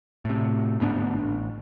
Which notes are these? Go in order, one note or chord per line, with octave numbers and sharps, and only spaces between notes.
A2 C3
D2 G#2 B3 D4
A1